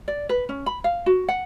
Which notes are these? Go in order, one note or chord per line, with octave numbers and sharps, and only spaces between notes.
D5
B4
C#4
B5
F5
F#4
F#5